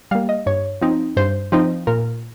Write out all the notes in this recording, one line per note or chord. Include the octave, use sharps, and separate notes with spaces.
G3 A#3 F5
D#5
G2 C#5
F3 C4 D#4
G2 C5
F3 C4 D#4
A#2 A#4